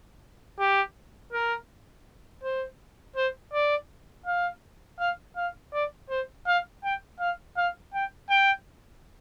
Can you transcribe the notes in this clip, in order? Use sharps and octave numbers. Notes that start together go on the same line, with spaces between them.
G4
A#4
C5
C5
D5
F5
F5
F5
D5
C5
F5
G5
F5
F5
G5
G5